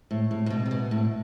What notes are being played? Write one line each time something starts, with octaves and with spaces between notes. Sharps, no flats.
A2
A2
A2
B2
C3
B2
A2